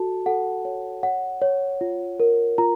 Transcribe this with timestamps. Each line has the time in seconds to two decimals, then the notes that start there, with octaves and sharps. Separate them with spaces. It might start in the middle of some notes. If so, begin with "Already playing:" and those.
Already playing: F#4 A4 A5
0.26 A4 F#5
0.65 C#5
1.03 C#5 F#5
1.42 C#5
1.81 F4
2.20 A#4
2.58 F4 A#5